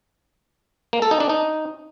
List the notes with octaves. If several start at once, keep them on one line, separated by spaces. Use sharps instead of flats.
A#3
A4
D#4
D4
D#4